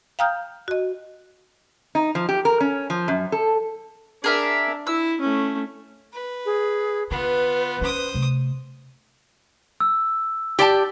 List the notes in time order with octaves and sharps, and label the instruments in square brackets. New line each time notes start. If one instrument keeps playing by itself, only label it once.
[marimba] F5 G5 A#5 D#6 F6 G6
F#4 D#5
[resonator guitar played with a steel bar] D#4
F3
G4
A#4
C#4
F3
F#2
A4
[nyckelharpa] D4 [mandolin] G#4 A#4 E5
[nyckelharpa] E4 [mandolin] E6
[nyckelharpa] A3 C#4
[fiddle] B4
[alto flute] G#4
[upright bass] D3 [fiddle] B3 F4 [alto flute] B4
[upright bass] C#4 [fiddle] C5 D#6
[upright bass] C3 A3
[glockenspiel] E6
[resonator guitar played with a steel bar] G4 D5 A5